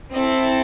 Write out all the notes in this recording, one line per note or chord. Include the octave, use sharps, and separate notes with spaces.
C4 E4 A4 D#5